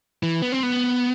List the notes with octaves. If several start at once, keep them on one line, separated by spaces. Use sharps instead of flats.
E3
B3
C4
B3